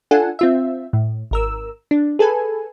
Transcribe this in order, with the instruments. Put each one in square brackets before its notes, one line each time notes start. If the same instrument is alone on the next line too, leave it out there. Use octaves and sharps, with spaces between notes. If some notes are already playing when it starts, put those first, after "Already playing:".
[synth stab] D4 F4 A4 F#5 G#5
C4 F4 E5
A2
G#1 A#4 E6
D4
G#4 A4 B4 G#5